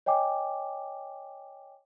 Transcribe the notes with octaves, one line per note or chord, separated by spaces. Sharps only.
C#5 D#5 G5 G#5 D6